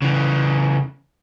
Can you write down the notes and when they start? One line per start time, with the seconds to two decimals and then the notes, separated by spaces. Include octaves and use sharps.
0.02 C#3 E3